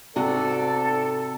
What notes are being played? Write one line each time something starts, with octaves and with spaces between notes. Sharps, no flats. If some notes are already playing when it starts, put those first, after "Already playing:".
G#2 C3 F#4 A4 D5 F#5